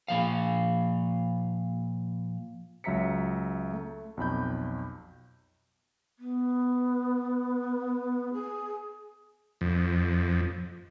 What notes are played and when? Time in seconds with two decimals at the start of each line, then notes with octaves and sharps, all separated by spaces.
0.08 A#2 F3 F5
2.84 C#2 F#3 E5 A#5 B6 C#7
3.73 A3
4.17 B1 F2 B5 G6
6.19 B3
8.33 G#4
9.61 F2